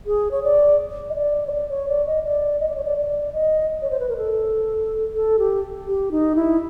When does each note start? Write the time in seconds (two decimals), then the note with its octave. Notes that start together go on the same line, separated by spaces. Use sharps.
0.06 G#4
0.31 C#5
0.44 D5
1.10 D#5
1.15 D5
1.47 C#5
1.52 D5
1.70 C#5
1.89 D5
2.07 D#5
2.24 D5
2.60 D#5
2.69 D5
2.76 C#5
2.84 D5
2.97 D5
3.33 D#5
3.82 C#5
3.90 C5
4.00 B4
4.09 A#4
4.17 A4
5.15 A4
5.39 G4
5.87 G4
6.11 D#4
6.35 E4